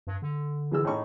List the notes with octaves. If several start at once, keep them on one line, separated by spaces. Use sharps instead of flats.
G2
D3
E3 G#4 E6
A2 D#4 C#6